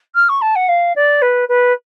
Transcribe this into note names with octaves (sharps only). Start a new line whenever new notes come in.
F6
C#6
A5
F#5
F5
D5
B4
B4